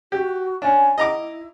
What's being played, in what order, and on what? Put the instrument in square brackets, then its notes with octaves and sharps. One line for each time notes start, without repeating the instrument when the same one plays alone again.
[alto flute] F#4 [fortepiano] G4
[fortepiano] C#4 D4 [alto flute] G#5
[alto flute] E4 [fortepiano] D#5 A#5 D6